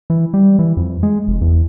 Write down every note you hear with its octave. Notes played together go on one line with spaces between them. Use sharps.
E3
G3
E3
F2
G#3
F1
E2